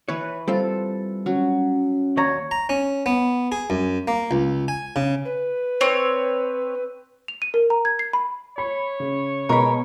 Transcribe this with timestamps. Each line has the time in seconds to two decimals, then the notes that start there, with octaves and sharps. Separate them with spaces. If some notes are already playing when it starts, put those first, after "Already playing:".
0.08 E3 B4 C#5
0.48 G3 C4 F4 A4
1.26 F#3 C#4
2.17 D#2 C#5 D5 A#5
2.51 A#5
2.69 C#4
3.06 B3
3.52 G#4
3.70 F#2
4.08 A#3
4.31 C#2
4.68 G#5
4.96 C#3
5.25 B4
5.81 C4 C#5
7.28 F7
7.42 D#7
7.54 A#4
7.70 A#5
7.85 G#6
7.99 C7
8.13 B5
8.58 C#5 B5
9.00 C#3
9.49 B2 G#3 A#4 D#5 B5 C#6